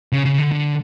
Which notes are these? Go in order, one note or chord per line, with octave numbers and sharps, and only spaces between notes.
C#3
C#3
D3
D3